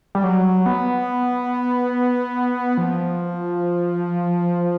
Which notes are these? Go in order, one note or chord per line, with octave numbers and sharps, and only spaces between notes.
G3
F#3
B3
F3